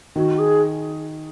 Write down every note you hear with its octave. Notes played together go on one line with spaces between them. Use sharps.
D#3 F#4
G#4